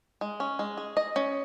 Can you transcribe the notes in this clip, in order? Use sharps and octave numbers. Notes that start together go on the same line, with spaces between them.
G#3
C#4
G#3
G#4
D#5
C#4